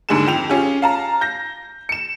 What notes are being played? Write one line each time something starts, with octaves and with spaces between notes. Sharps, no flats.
D#2 G#2 D3 G4 G#4 E7
F2 G5 F7
C#4 F4 G4 G#4
F5 A5 A#5
G6 A#6
C#7 E7